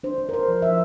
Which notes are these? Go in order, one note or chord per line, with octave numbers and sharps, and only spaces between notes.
D4 C5
D4
A#4
D4 C5
F3
F3 E5